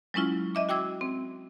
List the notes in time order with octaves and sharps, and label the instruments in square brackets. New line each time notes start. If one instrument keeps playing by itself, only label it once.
[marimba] F#3 G#3 C#4 E4 F4
D#5 E5 D6
F#4 G5 D6 E6 G#6
C4